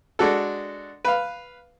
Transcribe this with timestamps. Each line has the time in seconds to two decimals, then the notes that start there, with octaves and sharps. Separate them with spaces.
0.19 G#3 D4 F#4 A4
1.05 B4 F5